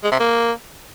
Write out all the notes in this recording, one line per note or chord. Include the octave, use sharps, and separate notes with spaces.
G#3
C3
A#3